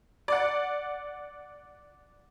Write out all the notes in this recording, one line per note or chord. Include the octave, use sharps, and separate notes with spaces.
D5 F#5